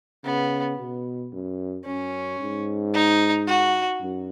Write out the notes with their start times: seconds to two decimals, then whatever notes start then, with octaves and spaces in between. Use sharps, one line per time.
0.25 C#3 B3
0.79 B2
1.33 F#2
1.86 F#2 C#4
2.40 G#2
2.94 D#4
3.47 F#4
4.01 F#2